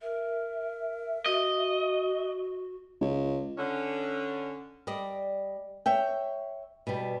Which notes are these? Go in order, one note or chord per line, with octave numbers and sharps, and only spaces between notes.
A#4 E5
F#4 D#5
C#2
D3 C#4
G3 D5 D#5
C#5 E5 G5
B2 G3